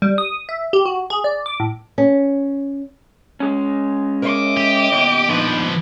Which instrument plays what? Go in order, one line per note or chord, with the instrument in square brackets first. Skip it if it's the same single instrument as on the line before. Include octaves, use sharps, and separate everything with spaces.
[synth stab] G3
D#6
E5
G4
F#4
G#4
D5
D6
A2
[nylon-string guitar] C#4
[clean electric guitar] G#3 C#4
[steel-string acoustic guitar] A#4 C#5 E5 [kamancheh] D#5 D6
[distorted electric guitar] G4
[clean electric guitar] D#2 B2
[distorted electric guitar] F3 B4 [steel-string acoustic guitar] D4 D#4